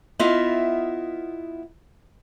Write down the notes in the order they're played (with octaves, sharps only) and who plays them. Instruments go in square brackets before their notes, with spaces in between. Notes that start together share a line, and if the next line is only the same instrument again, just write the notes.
[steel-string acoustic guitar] B3 E4 F4 D#5 E5